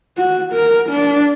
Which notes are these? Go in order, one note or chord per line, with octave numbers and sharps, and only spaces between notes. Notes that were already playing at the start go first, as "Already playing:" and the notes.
F#4
A#4
D4